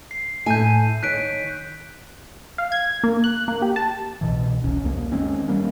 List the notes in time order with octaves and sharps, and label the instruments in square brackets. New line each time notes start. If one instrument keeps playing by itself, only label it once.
[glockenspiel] C7
[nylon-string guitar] A2 E5 G#5 [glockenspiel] G6 D#7
[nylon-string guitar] D#3 C#5 [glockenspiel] F#6 B6 D7
[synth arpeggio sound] F5
G#6
A#3
F#6
A#3
G4
A5
[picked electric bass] C2 B2 E3
F1 C2 C#4
C2 F2 A#3
D#3 G#3 C4 C#4
D#3 G3 A#3 C#4